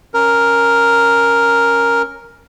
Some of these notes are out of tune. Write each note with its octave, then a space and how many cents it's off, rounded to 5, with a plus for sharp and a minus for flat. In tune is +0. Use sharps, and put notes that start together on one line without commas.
C#4 -5 A#4 +0